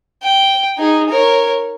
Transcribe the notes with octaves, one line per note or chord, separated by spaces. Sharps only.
G5
D#4 G#4
A#4 C#5